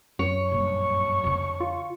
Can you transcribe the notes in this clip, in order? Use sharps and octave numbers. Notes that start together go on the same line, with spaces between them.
F#2 C#5
A#1 G2 C#6
F2 D3
F4